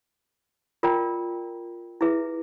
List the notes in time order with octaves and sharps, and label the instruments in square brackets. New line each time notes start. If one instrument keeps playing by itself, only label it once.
[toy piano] F4 A#4 D5 G5 A#5
E4 G#4 B4 E5